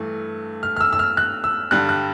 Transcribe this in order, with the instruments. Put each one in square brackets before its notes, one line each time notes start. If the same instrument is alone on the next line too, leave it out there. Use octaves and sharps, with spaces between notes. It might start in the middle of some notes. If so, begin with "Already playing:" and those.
Already playing: [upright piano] G2 E3 A3
F6
F6
E6
E6
F6
F#6
E6
G2 D3 G3 F#6
F#6